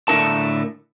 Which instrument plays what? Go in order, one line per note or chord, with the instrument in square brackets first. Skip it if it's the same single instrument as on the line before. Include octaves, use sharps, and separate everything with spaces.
[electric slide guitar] A2 D3 A3 D#4 A#4 A5